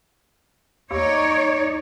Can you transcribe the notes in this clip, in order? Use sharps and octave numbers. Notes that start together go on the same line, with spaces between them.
D#2 D#4 C#5 D5